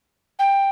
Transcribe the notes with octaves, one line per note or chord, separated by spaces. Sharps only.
G5